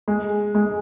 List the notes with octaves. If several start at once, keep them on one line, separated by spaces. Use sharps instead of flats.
G#3
G#3